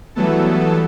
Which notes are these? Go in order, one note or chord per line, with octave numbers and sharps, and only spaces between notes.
E3 F#3 G3 A3 B3 A4